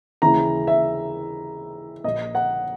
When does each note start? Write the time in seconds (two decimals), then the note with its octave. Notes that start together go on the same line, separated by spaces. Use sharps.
0.22 D#2 C#3 E3 A#5
0.67 E5
2.04 A#1 A#2 D#5
2.35 F#5